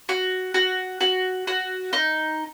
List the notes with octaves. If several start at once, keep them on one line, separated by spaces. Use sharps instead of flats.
F#4
F#4
F#4
F#4
D#4